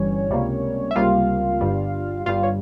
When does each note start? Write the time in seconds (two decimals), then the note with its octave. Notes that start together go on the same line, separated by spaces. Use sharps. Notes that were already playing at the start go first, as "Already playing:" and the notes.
Already playing: G1 G2 E3 G3 C#4 C#5
0.30 C#2 C3 G3 A#3
0.91 E5
0.96 C#2 C3 G3 A#3 F4 F5
1.61 G1 G2 G3
2.26 G1 G2 G3 F4 F5
2.43 C#5